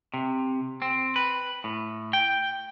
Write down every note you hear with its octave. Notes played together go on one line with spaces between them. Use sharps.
C3
C4
B4
A2
G5